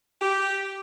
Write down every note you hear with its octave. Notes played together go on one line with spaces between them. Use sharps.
G4